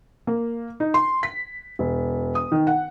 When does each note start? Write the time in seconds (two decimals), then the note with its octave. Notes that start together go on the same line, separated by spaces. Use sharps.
0.27 A#3
0.80 D#4
0.94 C6
1.23 B6
1.79 E1
2.35 D#6
2.52 D#3
2.67 F#5